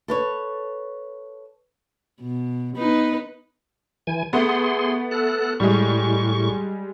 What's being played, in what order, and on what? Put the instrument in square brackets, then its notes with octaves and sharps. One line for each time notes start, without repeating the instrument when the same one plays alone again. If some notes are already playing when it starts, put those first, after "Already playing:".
[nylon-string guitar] A4 B4 C#5
[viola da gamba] B2
B3 D#4 B4
[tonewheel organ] E3 G#5
[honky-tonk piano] A3 B3 [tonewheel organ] G#4 C6
[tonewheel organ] A4 F#6
[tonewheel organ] A2 C#6 [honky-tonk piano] G3 G#3